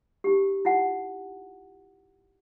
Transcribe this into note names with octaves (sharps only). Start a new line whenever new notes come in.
D#4 G4
E4 F4 F#5 A5